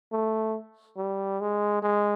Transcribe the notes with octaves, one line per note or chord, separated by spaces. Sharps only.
A3
G3
G#3
G#3